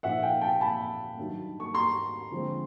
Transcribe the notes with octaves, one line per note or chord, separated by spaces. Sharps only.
A#2 F3 A#3 D#4 E5 F#5
F5 G5
G5 A5
A5 B5
G2 D#3 F#3
C#6
A#5 C6
D3 F3 G#3 C4